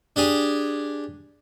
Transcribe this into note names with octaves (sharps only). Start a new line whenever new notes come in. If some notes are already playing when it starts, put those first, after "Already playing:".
D4 G4 G#4